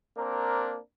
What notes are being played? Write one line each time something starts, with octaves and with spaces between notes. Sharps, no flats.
A#3 C4 D4 A#4